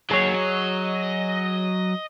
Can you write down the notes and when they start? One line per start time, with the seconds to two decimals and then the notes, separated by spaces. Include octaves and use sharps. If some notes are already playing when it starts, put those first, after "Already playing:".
0.11 D#2 F#3 G#4 C#5
0.35 D#5